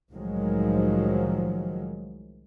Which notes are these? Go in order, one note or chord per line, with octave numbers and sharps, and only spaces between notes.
C2 A2 D#3 F3 F#3 G#3